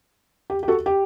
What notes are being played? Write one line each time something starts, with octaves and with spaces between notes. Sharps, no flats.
G4
G4
F#4 A4
G4